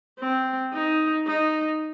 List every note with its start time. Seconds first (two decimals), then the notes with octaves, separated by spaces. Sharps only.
0.19 C4
0.73 D#4
1.27 D#4